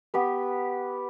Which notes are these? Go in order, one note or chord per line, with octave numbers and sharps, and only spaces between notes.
B3 G4 B4